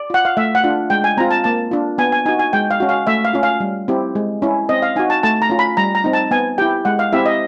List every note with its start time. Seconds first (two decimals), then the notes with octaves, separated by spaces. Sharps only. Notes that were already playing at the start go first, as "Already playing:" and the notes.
Already playing: D5
0.10 F4 F#5
0.25 F5
0.37 A3 E5
0.55 F#5
0.64 D4 F4
0.90 G#3 G5
1.04 G#5
1.17 C4 F4 A#5
1.31 A5
1.44 A#3 A5
1.71 D4 F4
1.98 B3 G#5
2.12 G#5
2.25 D#4 F#4 G#5
2.39 G#5
2.53 G#3 G5
2.71 F5
2.80 C#4 F#4
2.89 F5
3.07 A3 E5
3.25 F5
3.33 C#4 F4
3.43 F5
3.60 G3
3.88 C4 E4 G4
4.15 G#3
4.42 C#4 E4
4.69 C4 D#5
4.82 F5
4.96 D#4 F#4 G#5
5.10 A5
5.23 A3 A5
5.42 A#5
5.50 C#4 F4
5.59 B5
5.77 G3 A#5
5.95 A#5
6.04 C4 D#4
6.13 A5
6.31 B3 G#5
6.58 E4 G4 G5
6.85 G#3 F#5
6.99 F5
7.13 C4 E4 G4 E5
7.26 D#5